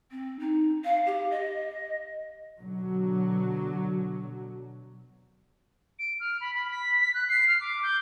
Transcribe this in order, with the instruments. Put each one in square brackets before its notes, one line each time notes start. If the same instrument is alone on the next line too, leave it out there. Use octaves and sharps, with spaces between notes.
[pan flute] C4
D#4
F5
G4
D#5
[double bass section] B2 D3 F#3
[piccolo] D7
F6
B5
B5
B6
B6
F#6
C7
F6
D6
G6